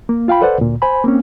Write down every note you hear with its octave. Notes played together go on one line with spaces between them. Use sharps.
A#3
F4 F5 G5 B5
A4 B4 C5 D5 F#5
D2 A#2
C5 G#5 B5
A#3 C4 C#4